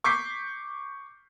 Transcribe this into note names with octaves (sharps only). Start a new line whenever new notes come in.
C#6 D6 G6 B6 C7